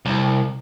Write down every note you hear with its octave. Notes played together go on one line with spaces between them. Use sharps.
C2